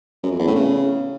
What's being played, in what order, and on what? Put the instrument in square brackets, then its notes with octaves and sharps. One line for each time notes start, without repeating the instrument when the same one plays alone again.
[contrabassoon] F#2
F2
E2
A2
C#3